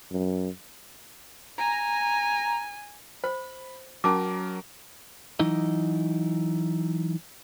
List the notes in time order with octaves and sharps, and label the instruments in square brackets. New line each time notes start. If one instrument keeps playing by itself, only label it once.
[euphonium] F#2
[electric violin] G#5 [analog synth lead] A#5
[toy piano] C5 [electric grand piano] B5
[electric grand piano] F#3 A#4 [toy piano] C#4 A5 D6
[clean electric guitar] E3 F#3 D#4 E4 D#5